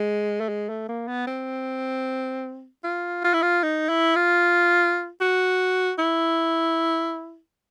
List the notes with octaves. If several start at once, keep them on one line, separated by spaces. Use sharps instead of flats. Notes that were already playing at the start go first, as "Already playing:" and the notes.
Already playing: G#3
A3
G#3
A3
A#3
B3
C4
F4
F4
E4
F4
D#4
E4
F4
F#4
E4